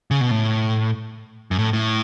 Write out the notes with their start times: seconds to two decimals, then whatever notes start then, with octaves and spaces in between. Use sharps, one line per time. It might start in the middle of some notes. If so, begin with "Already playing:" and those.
0.11 C#3
0.21 B2
0.31 A2
1.51 F#2
1.59 A2
1.73 A2